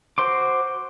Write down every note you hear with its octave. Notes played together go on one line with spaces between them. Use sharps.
F#4 C5 C6 D6